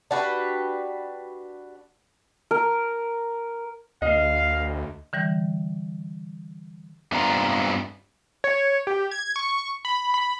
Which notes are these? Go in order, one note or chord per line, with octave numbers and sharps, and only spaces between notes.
D4 F#4 G4 B4
A#4
D2 D#5 F5
D3 E3 G3 G6
G2 B3 C4 D4 F4 A#5
C#5
G4
G#6
C#6
B5
B5